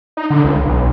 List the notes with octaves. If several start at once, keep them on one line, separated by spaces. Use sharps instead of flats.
D#4
D3
C#2
B1